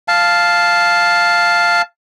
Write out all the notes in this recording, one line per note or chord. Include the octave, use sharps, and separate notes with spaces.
F5 A5